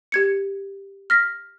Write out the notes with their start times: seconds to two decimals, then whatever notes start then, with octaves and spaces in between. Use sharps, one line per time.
0.12 G4 G#6 C#7
1.10 F6 A#6 B6